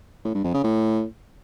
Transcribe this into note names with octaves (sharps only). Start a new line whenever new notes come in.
A2
G2
F2
C#3
A2